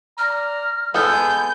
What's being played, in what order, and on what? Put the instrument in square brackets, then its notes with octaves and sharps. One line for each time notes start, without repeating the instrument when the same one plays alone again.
[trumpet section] D5 A#5 [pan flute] F6
[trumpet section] G#3 B4 G#5 [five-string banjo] B3 A4 [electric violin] G6